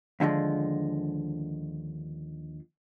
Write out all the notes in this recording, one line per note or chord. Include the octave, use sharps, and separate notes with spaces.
D#2 D3 F3 G#3